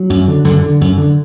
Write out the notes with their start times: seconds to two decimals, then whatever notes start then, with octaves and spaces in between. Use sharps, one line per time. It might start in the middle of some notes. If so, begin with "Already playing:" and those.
Already playing: F#3
0.10 F#2
0.28 D3
0.44 F#2 D3
0.63 D3
0.81 F#2
0.98 D3